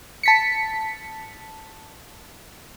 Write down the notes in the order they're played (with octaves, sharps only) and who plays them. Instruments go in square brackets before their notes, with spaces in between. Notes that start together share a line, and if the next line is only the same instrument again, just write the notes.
[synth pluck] A5 B6 C#7